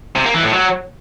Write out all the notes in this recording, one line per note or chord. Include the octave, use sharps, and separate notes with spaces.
C3
A#3
E3
A2
F#3